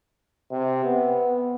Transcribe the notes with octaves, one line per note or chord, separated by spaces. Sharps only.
C3
B3